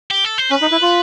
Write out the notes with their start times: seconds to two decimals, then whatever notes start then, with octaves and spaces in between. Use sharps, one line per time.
0.11 G4
0.24 A4
0.38 C5
0.51 C#4 B4
0.62 D#4
0.72 E4
0.82 F4